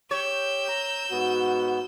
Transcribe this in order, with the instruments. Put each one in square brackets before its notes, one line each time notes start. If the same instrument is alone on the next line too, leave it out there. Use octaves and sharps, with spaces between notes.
[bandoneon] G4 G5 [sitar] C#5 [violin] E6 G6
[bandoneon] A#5
[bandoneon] G#2 B3 [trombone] F#4